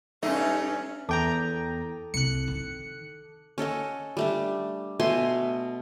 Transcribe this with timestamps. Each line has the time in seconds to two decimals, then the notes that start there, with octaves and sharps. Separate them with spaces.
0.23 G2 A3 C#4 D#4 E5
1.09 E2 A4 G5 A5 A#5 D6
2.14 C2 F#6 C#7
2.48 D#3
3.58 C#4 A4 D#5 F#5
4.17 G3 A3 D4
5.00 B2 A3 G#5 C6